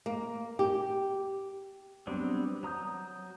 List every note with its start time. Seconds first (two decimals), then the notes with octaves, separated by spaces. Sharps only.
0.06 A#3
0.59 G4
2.07 F#3 G3 B3 C4 D4
2.63 F#3 A#5 D#6 G6